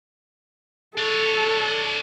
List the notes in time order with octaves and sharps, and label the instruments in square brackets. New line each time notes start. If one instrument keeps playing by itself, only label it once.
[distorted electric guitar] D4 C#5 [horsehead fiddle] A4